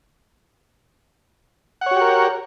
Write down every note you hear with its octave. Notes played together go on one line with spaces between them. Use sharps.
F#4 G4 A#4 C#5 F#5